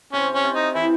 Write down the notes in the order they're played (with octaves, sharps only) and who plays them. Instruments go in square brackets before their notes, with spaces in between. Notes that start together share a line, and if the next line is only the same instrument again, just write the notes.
[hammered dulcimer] C3 [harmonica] C#4
[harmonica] C#4
[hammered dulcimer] C3
[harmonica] D#4
[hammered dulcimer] E3 [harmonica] E4